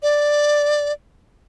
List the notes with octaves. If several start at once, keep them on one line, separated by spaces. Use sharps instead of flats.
D5